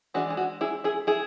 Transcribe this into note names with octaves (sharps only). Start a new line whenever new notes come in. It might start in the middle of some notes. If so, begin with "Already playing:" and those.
E3 G#3 D4 F#4
G#4
F#4
E4 G#4
E4 G#4
E4 G#4